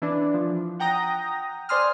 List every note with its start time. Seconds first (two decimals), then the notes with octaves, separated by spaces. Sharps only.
0.02 E3 D4
0.34 F3
0.80 F#5 G5 A#5 D#6 A#6
1.69 C5 D5 G#5 C6 D#6 F6